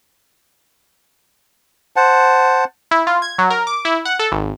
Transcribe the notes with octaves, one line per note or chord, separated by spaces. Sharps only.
C5 F#5 A5
E4
F4
G#6
F#3
A#4
D6
E4
F#5
A4
G#1